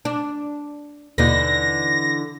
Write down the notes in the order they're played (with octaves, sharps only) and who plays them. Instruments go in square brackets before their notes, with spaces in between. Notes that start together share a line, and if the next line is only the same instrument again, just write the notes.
[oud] D4
[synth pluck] D#2 B2 A#3 [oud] D3 E3 D#4 [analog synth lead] A#6